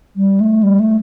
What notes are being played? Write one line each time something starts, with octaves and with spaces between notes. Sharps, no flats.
G3
A3
G3
A3